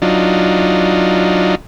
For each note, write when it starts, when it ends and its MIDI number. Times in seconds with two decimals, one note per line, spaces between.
0.02 1.55 54
0.02 1.55 62
0.02 1.55 63
0.02 1.55 65